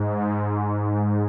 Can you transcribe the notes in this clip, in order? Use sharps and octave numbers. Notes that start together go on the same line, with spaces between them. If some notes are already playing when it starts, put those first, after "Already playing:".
Already playing: G#2